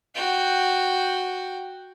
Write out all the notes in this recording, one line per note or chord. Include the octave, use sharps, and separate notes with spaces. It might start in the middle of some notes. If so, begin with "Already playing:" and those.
F#4 G5